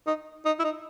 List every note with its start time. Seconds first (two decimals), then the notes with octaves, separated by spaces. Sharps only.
0.07 D#4
0.45 D#4
0.59 E4
0.64 D#4